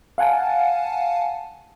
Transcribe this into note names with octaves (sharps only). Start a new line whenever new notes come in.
F5 F#5 G#5 A5